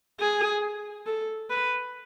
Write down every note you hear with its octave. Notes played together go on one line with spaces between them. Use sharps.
G#4
A4
B4